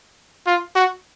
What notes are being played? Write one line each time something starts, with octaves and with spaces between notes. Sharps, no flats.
F4
F#4